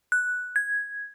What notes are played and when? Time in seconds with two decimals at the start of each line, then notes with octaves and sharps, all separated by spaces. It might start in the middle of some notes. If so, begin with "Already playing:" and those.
0.12 F#6
0.56 G#6